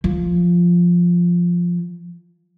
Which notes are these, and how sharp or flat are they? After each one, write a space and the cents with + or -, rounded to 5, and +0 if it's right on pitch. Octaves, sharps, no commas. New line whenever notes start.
F3 +0